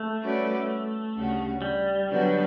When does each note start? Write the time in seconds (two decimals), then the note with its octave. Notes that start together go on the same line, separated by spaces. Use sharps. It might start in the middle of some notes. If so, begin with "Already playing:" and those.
Already playing: A3
0.21 G3 C#4 F#4 B4 D5
1.15 D2 C#3 G3 C#4 F#4
1.62 G3
2.09 D3 F#3 B3 F#4 B4